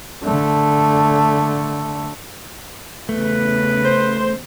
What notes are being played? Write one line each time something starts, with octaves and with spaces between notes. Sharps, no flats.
D3 A3
E2 C#3 A3 B4
C5